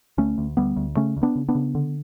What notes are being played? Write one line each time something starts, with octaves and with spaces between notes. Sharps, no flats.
D2 A3 C#4
D2
D2 G3 B3
D2
C#3 A3 C#4
D2
B3 D4
C#3
B3 D4
C#3
D3